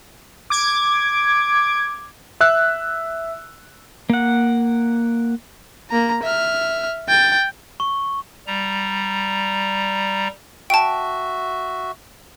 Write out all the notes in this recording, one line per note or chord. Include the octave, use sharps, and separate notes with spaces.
D6 G#6
E5 E6 F#6
A#3 F#5
A#3 A#5
E5 F6
G5 A6
C#6
G3 A#5
F#4 E5 G5 A5